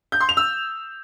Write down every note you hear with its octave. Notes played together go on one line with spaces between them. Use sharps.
G6
C6
F7
E6